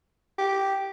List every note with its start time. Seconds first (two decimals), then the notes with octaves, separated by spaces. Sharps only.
0.38 G4